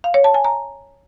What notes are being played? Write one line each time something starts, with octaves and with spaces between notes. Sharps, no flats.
F5
C#5
A5
G#5
A#5